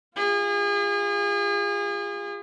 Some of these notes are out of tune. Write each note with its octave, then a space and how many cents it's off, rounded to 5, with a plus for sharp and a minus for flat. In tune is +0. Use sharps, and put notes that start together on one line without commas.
F4 +0 G#4 -35